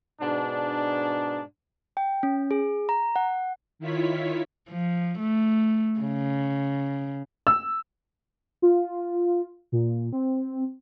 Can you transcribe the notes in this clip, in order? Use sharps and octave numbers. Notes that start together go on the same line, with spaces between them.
G#2 B2 D4
G5
C#4
G#4
A#5
F#5
D#3 E4 F4 C#5 B6
F3
A3
C#3
E6
F4
A#2
C4